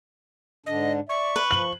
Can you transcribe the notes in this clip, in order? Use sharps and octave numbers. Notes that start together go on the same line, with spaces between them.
G#2 D3 D4 D#5
D5 E5 C#6
B4
F3 F#7